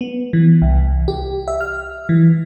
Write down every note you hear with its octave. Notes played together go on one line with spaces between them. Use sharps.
B3
E3
C2
G4
E5
F6
E3